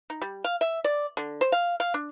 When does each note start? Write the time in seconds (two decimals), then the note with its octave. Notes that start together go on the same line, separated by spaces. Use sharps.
0.10 D#4
0.22 G3
0.44 F5
0.61 E5
0.84 D5
1.17 D3
1.41 C5
1.52 F5
1.80 F5
1.94 D4